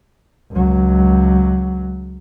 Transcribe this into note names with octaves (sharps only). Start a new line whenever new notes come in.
C#2 F#3